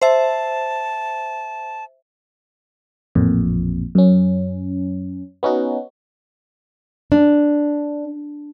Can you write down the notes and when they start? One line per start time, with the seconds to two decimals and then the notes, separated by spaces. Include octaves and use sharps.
0.02 C5 E5 A5
3.15 A1 F2 A#2
3.95 F#2 C#4
5.43 B3 C#4 D#4 F#4
7.12 D4